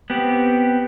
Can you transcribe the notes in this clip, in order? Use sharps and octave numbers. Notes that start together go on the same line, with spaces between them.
B3 C4 G4